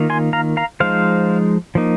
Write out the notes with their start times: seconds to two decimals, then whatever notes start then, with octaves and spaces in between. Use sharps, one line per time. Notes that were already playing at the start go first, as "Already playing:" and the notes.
Already playing: D#3 A#3 F4
0.10 G#5 C6
0.33 F5 A#5
0.57 F5 A#5
0.80 F3 G#3 D#4 C5 F5
1.75 F3 A#3 D#4